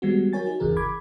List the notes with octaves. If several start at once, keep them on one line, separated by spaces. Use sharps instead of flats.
D#3 G3 G#3 B3 C4 F#4
F#3 F#4 A#4 C#5 G#5 A6
D#4 F#4
G1 D#2 C#3 E3 G#4 A#4
B5 D6 G#6